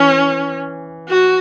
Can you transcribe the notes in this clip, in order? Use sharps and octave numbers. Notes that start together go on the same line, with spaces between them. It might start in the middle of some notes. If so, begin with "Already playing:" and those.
Already playing: E3 C#4
F#4